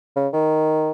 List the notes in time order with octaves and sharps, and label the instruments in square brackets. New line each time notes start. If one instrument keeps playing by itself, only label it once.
[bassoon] C#3
D#3